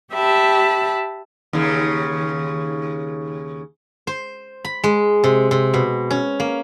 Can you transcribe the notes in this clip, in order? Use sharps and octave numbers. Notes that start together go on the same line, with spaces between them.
G4 E5 A5 B5
D#2 C#3
C5
B5
G#3
C3
C3
B2
C#4
A#3